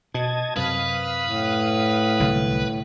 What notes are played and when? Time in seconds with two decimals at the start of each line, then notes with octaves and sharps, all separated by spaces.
0.14 B2 D#5 A5 G#6
0.57 F#2 C3 B4 F5 D#6
1.26 A2
2.20 C2 D3 F#3